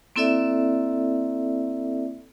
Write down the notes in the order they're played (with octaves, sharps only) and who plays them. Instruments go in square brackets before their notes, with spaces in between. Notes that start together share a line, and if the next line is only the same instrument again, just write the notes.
[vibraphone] A#3 C4 E4 A4 D5 E5